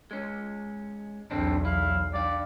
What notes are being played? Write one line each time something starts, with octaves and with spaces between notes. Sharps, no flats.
G#3 C#4
B1 E2 D3 C4 D4
E4 F5
G2 D5 F5